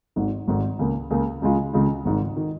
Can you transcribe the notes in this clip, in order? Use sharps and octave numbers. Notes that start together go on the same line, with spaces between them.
G#1 G#2 D#3
G#1 G#2 D#3
C#2 C#3 A#3
C#2 C#3 A#3
C#2 C#3 G#3 F4
C#2 C#3 G#3 F4
G#1 G#2 D#3
D#3